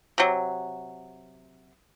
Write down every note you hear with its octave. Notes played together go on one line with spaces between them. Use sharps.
C3 F#3